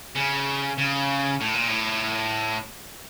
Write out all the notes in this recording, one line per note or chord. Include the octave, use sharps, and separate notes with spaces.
C#3
C#3
A2
A#2
A2